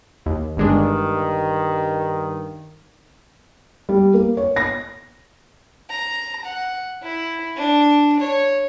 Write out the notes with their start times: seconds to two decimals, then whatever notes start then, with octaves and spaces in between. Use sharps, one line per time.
0.26 D#2
0.57 G1 G2 D#3 G#3 D4
3.89 G3
4.14 A#3
4.37 C#5
4.56 A#6
5.90 A#5
6.45 F#5
7.02 E4
7.56 D4
8.20 C#5